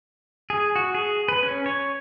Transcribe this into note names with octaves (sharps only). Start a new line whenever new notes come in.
G#4
F#4
G#4
B4
C#4
C#5